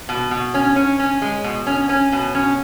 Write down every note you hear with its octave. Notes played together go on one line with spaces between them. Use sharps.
B2
B2
C#4
C#4
C#4
G#3
B2
C#4
C#4
B2
C#4